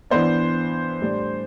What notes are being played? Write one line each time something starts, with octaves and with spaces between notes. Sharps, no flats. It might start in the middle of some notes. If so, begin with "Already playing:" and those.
E3 B3 D4 C5
A2 G3 D4